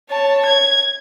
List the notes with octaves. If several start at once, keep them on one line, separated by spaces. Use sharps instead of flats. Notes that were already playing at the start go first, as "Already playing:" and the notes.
C#5 A5
G#6